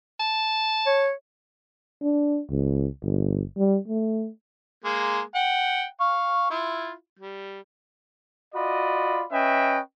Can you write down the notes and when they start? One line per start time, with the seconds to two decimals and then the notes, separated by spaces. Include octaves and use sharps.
0.20 A5
0.86 C#5
2.02 D4
2.50 C#2
3.03 G1
3.58 G3
3.88 A3
4.84 G#3 A#3
5.35 F#5 G5
6.00 F5 C#6
6.50 E4 F4
7.19 G3
8.55 F4 F#4 D5 D#5 B5
9.32 C#4 B4 D#5 E5 G5